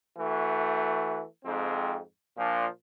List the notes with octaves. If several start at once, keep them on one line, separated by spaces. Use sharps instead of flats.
E3 A3 F#4
F2 G#2 C4
A#2 F3 D4